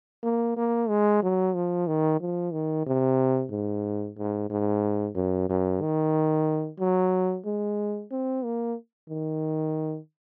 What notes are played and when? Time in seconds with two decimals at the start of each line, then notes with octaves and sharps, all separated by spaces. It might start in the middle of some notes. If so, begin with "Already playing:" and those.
0.23 A#3
0.56 A#3
0.89 G#3
1.23 F#3
1.55 F3
1.87 D#3
2.21 F3
2.53 D#3
2.86 C3
3.51 G#2
4.18 G#2
4.50 G#2
5.16 F#2
5.49 F#2
5.82 D#3
6.80 F#3
7.46 G#3
8.11 C4
8.44 A#3
9.09 D#3